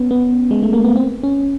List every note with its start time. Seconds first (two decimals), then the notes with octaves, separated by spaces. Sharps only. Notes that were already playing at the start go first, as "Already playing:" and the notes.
Already playing: B3 C#4
0.11 B3
0.51 G#3
0.63 A3
0.73 A#3
0.84 B3
0.96 C4
1.23 C#4